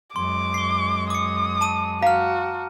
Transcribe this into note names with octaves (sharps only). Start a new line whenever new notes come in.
F#2 G#3 C6 D6
C7 G7
D6 D#6 C#7
A5 D#7
F#4 F5 A#5 F6